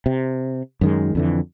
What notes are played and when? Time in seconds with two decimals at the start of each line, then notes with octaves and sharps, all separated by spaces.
0.06 C3
0.81 F#2 D#3 G#3
1.15 F2 D3 E3